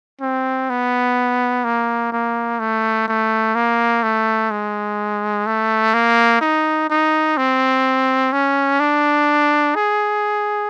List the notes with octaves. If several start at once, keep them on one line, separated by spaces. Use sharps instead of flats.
C4
B3
A#3
A#3
A3
A3
A#3
A3
G#3
A3
A#3
D#4
D#4
C4
C#4
D4
G#4